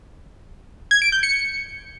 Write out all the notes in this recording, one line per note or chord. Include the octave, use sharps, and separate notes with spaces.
G#6
D7
G6
C#7